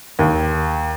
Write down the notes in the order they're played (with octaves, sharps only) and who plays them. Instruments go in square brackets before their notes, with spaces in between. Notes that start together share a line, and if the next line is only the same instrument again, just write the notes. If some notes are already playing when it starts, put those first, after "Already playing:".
[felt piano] D#2